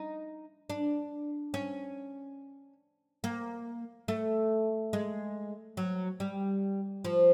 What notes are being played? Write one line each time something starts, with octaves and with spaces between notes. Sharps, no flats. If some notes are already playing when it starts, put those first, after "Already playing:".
Already playing: D#4
D4
C#4
A#3
A3
G#3
F#3
G3
F3